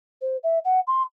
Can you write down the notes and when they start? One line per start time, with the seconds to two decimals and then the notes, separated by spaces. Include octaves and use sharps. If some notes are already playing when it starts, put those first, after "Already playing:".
0.22 C5
0.44 E5
0.65 F#5
0.87 C6